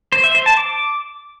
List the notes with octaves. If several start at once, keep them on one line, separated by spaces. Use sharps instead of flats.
C5
E5
C5
A5
D6